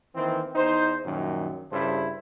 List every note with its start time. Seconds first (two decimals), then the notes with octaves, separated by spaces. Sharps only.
0.15 D#3 E3 A#3 C4
0.56 E2 D#4 C5
1.05 A#1 F#2 A#2 D#3
1.71 G2 C#3 E4 A4 C5